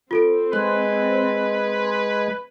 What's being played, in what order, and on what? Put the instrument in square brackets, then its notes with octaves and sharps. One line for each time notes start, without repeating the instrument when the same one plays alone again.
[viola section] C4 [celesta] F4 A4 D7
[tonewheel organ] G#3 [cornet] B4 [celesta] F#6